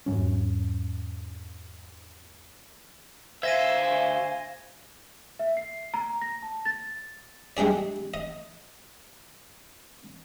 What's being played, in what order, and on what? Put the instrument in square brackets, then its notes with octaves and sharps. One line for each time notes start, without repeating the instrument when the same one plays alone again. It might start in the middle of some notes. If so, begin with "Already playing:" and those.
[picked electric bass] E2 G#2 F#3 C#4
[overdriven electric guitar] D2 E5 [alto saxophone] C5 [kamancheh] F5 G#5 [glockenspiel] G#6 A#6 D#7
[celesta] E5
C7
A#5
A#6
A5
A6
[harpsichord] G3 G#3 D4 G#4 D5
D#5